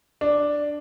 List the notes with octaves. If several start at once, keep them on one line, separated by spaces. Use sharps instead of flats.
D4